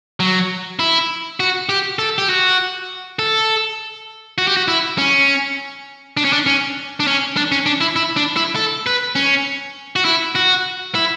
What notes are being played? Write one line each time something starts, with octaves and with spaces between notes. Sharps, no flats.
F#3
E4
F#4
G4
A4
G4
F#4
A4
F#4
G4
F#4
E4
C#4
D4
C#4
D4
C#4
D4
C#4
D4
C#4
D4
E4
E4
D4
E4
A4
B4
C#4
F#4
E4
F#4
E4